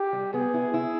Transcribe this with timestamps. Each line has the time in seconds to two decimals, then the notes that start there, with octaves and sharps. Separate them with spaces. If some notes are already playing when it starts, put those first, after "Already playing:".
Already playing: G4
0.13 G3
0.33 B3 G#4
0.54 E4
0.74 E4